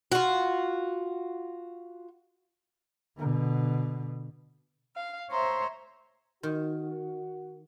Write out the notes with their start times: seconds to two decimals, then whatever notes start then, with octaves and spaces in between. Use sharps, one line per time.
0.12 F4 F#4
3.18 B2 D3
4.96 F5
5.31 C5 C#5 E5 A#5 C6
6.43 D#3 F#4